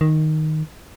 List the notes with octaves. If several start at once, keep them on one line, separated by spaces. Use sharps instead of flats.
D#3